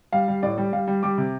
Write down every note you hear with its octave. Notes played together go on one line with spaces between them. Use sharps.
G3 F5
G3
A2 D5
G3
G3 F5
G3
G3 D6
C3